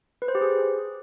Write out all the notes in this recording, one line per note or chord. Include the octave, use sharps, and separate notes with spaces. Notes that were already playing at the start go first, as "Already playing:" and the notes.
B4
C5
G4
G#4